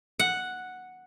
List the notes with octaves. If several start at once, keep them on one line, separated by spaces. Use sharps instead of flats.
F#5